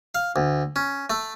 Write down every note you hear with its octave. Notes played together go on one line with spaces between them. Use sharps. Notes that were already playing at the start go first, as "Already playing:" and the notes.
F5
D2
C#4
A3